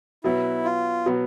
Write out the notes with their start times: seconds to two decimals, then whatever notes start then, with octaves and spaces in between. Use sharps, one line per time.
0.24 B2 F#3 B3 E4
0.65 F4
1.06 B2 F#3 B3